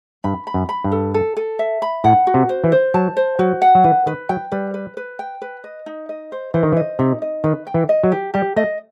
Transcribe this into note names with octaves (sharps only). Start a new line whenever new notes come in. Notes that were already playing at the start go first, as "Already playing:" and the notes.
G2 B5
B5
F#2
B5
G2
A4
A4
A4
E5
B5
A2 F#5
F#4
C3
C5
E3
C5
F#3 A5
C5
F#3 F#4
F#5
F#3
E3 B4
D#3 B4
F#3 G5
G3 B4
B4
B4
G5
B4
D#5
D#4
D#5
C5
E3 C5
D#3
E3
D#5
C3 D#4
D#5
D#3 B4
G5
E3
D#5
F#3
G4
G3 G4
A3 D#5